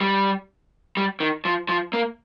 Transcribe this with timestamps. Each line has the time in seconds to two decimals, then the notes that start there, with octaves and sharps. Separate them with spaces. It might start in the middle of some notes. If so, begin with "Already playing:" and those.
0.01 G3
0.97 G3
1.20 D#3
1.45 F3
1.69 F3
1.93 A#3